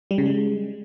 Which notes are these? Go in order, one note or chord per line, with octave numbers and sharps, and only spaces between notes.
G3
C#3
G#3